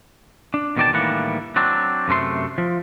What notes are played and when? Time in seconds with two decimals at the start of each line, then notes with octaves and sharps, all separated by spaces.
0.54 D4
0.77 E2 B2 D#3 D5 G5 A5
0.93 A2 D#3 E3 G3 A#3 F#5
1.56 F#3 C4 D4
2.08 F#2 C3 A3 C6
2.58 F3